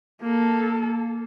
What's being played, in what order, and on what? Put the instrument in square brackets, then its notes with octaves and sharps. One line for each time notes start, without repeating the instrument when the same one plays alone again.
[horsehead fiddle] A#3 A4